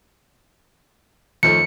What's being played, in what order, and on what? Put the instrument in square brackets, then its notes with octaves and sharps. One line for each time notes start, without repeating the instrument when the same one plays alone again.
[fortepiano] D#2 F3 A3 [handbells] C#7